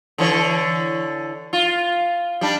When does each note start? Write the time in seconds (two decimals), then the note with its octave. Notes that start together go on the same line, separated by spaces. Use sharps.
0.18 D3 E3 C#5
1.53 F4
2.41 G3 D4